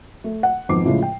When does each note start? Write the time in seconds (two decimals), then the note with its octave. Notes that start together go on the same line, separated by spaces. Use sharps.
0.24 A3
0.43 F#5
0.69 G#1 F2 B3 D#4 D6 C7
0.85 A2 C#3 F3 G#3
1.02 G5